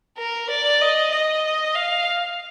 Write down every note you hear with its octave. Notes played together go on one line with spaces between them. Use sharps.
A#4
D5
D#5
D#5
F5